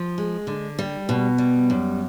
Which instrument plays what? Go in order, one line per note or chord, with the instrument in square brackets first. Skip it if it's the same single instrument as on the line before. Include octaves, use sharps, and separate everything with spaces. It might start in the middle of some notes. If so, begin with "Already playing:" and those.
Already playing: [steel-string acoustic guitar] F3
G#3
D3
G3
B2
G3
F#2